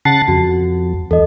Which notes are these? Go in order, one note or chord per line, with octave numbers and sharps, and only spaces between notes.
C#3 F#5 A5 A6 B6 C7
F2 F#4
E2 A4 D#5